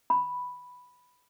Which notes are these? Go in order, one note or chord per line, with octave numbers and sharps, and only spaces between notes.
B5